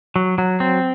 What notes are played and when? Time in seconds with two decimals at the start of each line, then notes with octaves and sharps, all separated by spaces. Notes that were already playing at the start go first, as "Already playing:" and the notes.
0.16 F#3
0.38 F#3
0.60 C4